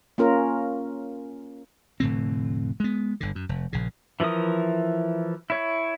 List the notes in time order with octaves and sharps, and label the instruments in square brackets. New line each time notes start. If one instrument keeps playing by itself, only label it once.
[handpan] A#3 C#4 F4 A#4
[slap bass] F1 A2 D3 C4
G#3 B3
G1 D3
F#2
F1
A#1 C#3
[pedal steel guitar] E3 F3 E4 A#4 D#6
E4 C#5